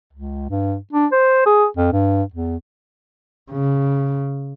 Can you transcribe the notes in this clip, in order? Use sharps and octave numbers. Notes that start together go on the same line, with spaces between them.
C#2
G2
D4
C5
G#4
F2
G2
E2
C#3